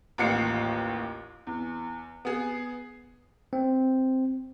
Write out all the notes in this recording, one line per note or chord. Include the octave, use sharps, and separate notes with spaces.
A1 D#2 F4 C7 C#7
E2
B3 G#4
C4